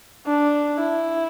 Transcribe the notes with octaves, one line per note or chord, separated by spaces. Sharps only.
D4
E4